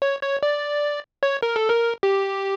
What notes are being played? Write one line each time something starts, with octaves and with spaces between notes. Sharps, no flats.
C#5
C#5
D5
C#5
A#4
A4
A#4
G4